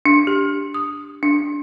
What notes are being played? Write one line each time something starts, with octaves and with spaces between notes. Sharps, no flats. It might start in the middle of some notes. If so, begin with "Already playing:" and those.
D4
G4
D#6
D4